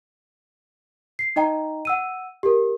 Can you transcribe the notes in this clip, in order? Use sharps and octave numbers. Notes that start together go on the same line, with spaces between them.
C7
D#4 D#5 G5 A#5
F#5 E6 D#7
G4 A#4